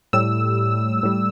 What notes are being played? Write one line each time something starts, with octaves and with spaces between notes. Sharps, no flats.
A2 G3 E6
A2 G3